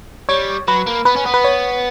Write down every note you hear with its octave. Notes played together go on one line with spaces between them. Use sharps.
G3 C#5
F#3 B4
A#3
B3 B4
C#4
B3
B4
C#5